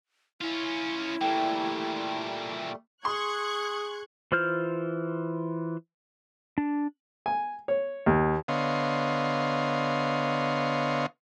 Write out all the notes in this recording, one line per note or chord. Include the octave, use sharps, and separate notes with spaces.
C#4 E4 F4
A#2 E3 G3 A3 G5
G#4 C6 C#6 D#6 F#6 G#6
E3 F4 C5 F6 G6
D4
G#5
C#5
D#2
D3 B3 C#5 D#5 F5 C6